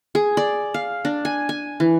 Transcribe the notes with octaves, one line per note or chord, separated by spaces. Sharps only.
G#4
D5
F5
D4
G#5
G#5
E3